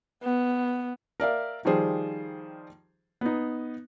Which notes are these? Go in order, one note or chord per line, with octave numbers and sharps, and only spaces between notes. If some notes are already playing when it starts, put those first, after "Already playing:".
B3
A#4 D5 E5 F5
D#3 F3 G3 G#4 C5
B3 D#4